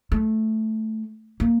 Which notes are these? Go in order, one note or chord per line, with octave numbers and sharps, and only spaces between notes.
A3
A#3